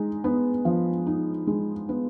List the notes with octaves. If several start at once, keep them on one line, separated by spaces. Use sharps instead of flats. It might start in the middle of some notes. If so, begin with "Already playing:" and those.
Already playing: G#3 D#4
B3
F3
D#4
G#3
B3